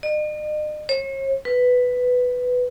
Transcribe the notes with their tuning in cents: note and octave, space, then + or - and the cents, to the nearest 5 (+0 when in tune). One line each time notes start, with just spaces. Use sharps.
D#5 -45
C#5 -40
B4 +5